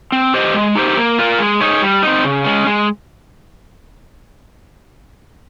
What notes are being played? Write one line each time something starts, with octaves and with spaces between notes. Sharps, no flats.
C4
G4 C5 D#5
G#3
D#4 G4 C5
A#3
F4 A#4
G#3
D#4 G#4 C#5
G3
C4 D#4
C#3
G#3 C#4
G#3